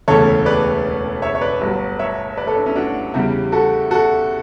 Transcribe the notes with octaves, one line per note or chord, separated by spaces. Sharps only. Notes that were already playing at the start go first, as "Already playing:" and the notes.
E1 D2 C#3 E3 A4 C#5
B4 D5
C#5 E5
C#5
B4 D5
G1 G2 F#3
C#5 E5
B4 D5
A4 C#5
D4
C#4 E4
D4 F#4
E2 C#3 G3 E4 G4
F#4 A4
F#4 A4